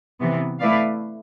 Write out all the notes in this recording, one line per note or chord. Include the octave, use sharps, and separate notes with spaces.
C3 E3 B3
A3 E4 B4 D5 F5